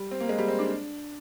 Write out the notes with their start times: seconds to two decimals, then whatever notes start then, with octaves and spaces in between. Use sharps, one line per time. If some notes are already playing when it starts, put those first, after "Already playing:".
Already playing: G3
0.11 C4
0.20 A#3
0.29 G#3
0.38 G3
0.48 C4
0.59 D4